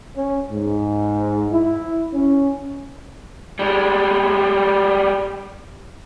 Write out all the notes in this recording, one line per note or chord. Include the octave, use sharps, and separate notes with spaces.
C#4
G#2
E4
C#4
G3 G#3